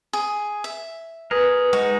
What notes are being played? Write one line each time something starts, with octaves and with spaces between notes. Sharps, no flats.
G#4
E5
G#4 A#4 B4
G#3 D#4 F#4